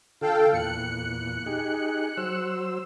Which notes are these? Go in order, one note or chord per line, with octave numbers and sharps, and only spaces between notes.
D3 F4 A4 F5 G5
E2 A#2 F#6 C#7
D#4 G4 G#4
F#3 C5 E6